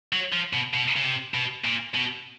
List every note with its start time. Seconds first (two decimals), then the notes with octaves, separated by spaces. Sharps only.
0.13 F#3
0.33 F3
0.53 B2
0.74 B2
0.96 C#3
1.04 C3
1.34 B2
1.65 A#2
1.94 B2